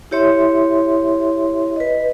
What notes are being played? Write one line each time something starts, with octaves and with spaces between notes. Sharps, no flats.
E4 G4 C#5 E5 C6
B4 D#5